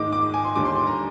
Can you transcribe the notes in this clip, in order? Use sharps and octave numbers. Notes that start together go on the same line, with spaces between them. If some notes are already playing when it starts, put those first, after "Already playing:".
Already playing: G#2 D#3 G#3 D#4 D6
D6
G#5
C6
D#2 D3 G3 D6
C6
C6
A#5